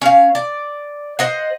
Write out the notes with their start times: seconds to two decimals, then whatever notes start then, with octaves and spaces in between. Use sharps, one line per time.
0.02 C#4 F5
0.35 D5
1.19 C5 D#5 F#5